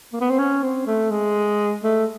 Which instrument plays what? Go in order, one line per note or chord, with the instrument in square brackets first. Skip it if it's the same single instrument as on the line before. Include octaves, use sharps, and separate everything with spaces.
[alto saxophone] A#3
B3
C4
C#4
C4
A3
G#3
A3